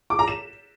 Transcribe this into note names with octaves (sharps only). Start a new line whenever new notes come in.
D6
A#5
E7